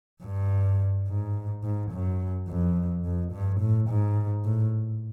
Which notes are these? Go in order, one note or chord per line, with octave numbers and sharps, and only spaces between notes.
G2
G#2
G#2
F#2
F2
F2
G2
A2
G#2
A2